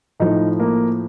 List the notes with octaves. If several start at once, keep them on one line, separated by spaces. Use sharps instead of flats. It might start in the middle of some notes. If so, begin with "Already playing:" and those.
A2 F3 D#4
A#3